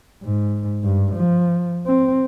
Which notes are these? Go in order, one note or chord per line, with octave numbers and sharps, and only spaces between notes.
G#2
G2
F3
C4